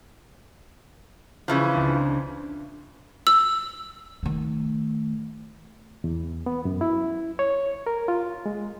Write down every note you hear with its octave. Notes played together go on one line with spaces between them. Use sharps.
C#3 E3 F3
C#2 C4 D4
E6
D#3 A3
E2
B3
F#2
E4
C#5
A#4
F4
G#3